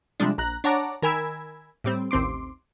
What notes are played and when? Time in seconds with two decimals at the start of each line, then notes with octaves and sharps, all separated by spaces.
0.20 C3 F3 G3 G#3 D4
0.38 A#1 A#5 F#6
0.64 D4 C#5 F#5 A5 A#5 D6
1.02 D#3 A#4 G#5 B5 E6 G#6
1.84 A2 G3 C4
2.11 A1 D#2 C4 C6 D6